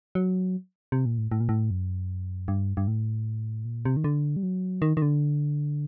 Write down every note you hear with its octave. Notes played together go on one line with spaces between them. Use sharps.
F#3
C3
A#2
A2
A2
A#2
A2
F#2
G2
G2
A2
A#2
C3
D#3
D3
G3
F#3
D#3
D#3
D3